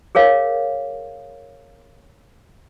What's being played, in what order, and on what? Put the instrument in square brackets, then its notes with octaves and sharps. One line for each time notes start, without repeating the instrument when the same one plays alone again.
[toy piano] G#4 A#4 C#5 F5